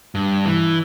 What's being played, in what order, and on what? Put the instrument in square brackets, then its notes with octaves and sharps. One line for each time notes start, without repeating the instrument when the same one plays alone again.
[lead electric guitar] G2
E3